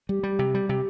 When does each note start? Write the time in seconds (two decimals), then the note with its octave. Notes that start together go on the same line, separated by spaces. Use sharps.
0.09 G3 G4
0.23 G3
0.39 C3
0.55 G3
0.69 C3 G4